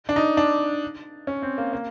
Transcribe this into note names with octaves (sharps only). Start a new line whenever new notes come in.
D4
D#4
D4
C#4
C4
A#3
A#3